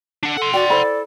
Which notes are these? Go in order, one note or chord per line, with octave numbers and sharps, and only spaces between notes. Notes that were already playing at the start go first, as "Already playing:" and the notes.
D4 F#5
A4 F#5 C6
F#4 D5 G5
E4 A4 C5 B5